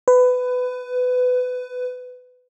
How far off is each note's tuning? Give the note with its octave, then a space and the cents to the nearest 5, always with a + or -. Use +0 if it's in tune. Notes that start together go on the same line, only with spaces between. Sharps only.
B4 +20